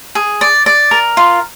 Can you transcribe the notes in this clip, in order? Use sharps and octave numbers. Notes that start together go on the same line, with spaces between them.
G#4
D5
D5
A#4
F4